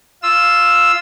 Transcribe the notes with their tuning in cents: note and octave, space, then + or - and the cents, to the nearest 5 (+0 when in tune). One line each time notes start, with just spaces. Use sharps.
F4 +0 E6 +0